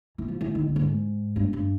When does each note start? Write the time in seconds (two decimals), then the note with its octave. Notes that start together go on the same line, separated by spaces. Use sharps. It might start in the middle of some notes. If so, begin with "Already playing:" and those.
0.18 E3
0.28 F3
0.41 E3
0.55 D#3
0.68 D3
0.76 A2
0.81 G#2
1.36 G2
1.53 G2